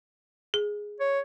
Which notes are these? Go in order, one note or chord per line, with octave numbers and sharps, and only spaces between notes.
G#4
C#5